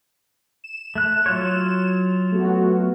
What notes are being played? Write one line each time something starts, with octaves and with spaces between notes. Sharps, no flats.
E7
A3 F#6
F#3 F4 C#5
A3 B3 F#4